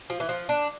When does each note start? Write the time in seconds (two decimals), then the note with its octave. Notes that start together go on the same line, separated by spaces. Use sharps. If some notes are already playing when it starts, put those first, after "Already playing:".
0.10 F3
0.20 E3
0.29 F3
0.49 D4